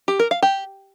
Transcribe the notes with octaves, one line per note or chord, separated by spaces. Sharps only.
G4
A#4
F5
G4